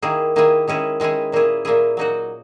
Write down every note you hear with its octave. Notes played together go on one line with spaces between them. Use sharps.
D#3 A#3 E4 G#4
D#3 A#3 E4 G#4
D#3 G#3 C#4 E4 G#4
D#3 G#3 C#4 E4 G#4
A#2 A#3 E4 G#4
A#2 A#3 E4 G#4
F#3 A#3 D#4 F#4